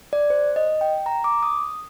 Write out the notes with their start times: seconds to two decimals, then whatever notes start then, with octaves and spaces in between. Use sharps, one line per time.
0.13 D5
0.30 C5
0.56 D#5
0.81 G5
1.06 A#5
1.24 D6
1.43 D#6